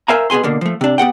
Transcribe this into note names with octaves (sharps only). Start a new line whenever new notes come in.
A#4 C5 E5 F5 G#5 A#5
B2 B3 G#4 G#5 C6
B2 D3 A#3
F3 A3
C3 D4
B3 G4 F#5 G5